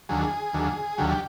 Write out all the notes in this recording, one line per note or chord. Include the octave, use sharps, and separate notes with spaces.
D#2 D3 F#3 G#4
D#2 D3 F#3
D#2 D3 F#3 G4
G4